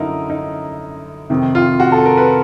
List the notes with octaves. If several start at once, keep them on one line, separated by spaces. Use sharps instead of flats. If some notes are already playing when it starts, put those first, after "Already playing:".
Already playing: F#2 D3 F#3 D#4 E4 A#4
D#4
F2 C3 D#3
F4
F#4
A4
A#4
B4